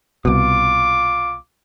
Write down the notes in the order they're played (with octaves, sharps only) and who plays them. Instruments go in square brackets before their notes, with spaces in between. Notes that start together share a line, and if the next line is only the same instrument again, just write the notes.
[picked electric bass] C2 B2 [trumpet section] F4 D6